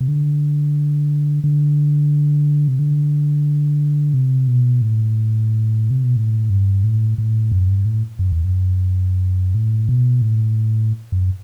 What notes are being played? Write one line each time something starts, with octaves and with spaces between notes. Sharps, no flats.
C3
D3
D3
C3
D3
C3
B2
A2
C3
B2
A2
G2
A2
A2
F#2
G2
A2
F#2
E2
F#2
A2
B2
A2
F#2